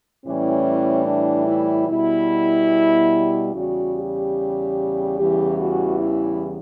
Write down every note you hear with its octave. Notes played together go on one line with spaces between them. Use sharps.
A2 E3 G3 C#4
D4
E4
B2 G3 E4
E2 C#3 G3 F#4
G4
E2 C#3 E3 G3 G4
F#4
E4